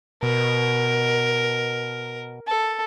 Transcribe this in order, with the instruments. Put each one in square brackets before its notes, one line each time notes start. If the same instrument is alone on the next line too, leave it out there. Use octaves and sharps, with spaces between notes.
[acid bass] B2 [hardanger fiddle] A#4
[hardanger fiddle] A4